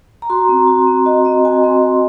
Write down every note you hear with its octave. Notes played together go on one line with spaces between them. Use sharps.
A#5
F#4 C6
C4
F#4
C4
F#4 D#5
C4 D#5
F#4 G#5
C4 C6
F#4